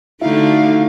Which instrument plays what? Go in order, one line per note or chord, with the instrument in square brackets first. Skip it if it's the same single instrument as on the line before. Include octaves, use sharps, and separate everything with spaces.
[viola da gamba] D3 A3 F#4 [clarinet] D#4 [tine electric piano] E4 E5 [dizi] F5